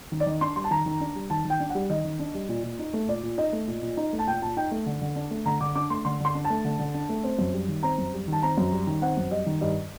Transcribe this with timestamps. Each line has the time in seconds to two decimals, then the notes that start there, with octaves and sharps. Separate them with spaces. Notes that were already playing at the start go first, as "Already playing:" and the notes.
0.12 D#3
0.20 D5
0.26 D#3 D#5
0.41 D4 C6
0.56 G3 C6
0.64 A5
0.71 D#3 A#5
0.86 D#3
1.01 D4
1.15 G3
1.30 D#3 A5
1.45 D#3 G5
1.60 D4
1.70 F#5
1.75 G3
1.90 D#3 D#5
2.05 D#3
2.19 D4
2.35 G3
2.49 A#2
2.64 A#2
2.79 D#4
2.93 A3
3.08 A#2 D5
3.23 A#2
3.38 D#4 D#5
3.53 A3
3.67 A#2
3.83 A#2
3.97 D#4
4.13 A3
4.19 A5
4.27 A#2 G5
4.42 A#2 A5
4.57 D#4 G5
4.71 A3
4.86 D3
5.01 D3
5.16 D4
5.31 A3
5.46 D3 A#5
5.61 D3 D6
5.75 D4 D6
5.90 A3 C6
6.05 D3 C6
6.20 D3 C6
6.35 D4
6.45 A5
6.50 A3
6.64 D3
6.79 D3
6.94 D4
7.09 A3
7.23 C4
7.39 F#2
7.54 G3
7.68 D#3
7.83 C4 A#5
7.98 F#2
8.13 G3
8.28 D#3 A5
8.42 C4 A#5
8.57 F#2
8.72 G3
8.87 D#3
9.02 C4 F#5
9.17 F#2
9.31 G3 D#5
9.46 D#3
9.61 G2 D#5